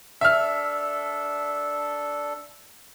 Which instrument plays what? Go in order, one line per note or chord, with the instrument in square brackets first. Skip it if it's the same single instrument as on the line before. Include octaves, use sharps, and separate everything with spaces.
[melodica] D4 A4 [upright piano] E5 F6